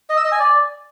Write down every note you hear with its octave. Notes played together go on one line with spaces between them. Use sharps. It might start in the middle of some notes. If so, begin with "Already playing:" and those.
D#5
E6
D#5
G#5
D5